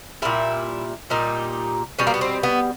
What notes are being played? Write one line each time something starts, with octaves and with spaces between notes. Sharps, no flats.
A#2 G3 E4
A#2 G3 D#4
B2 G3 C#4
A#3
B3
C4
B3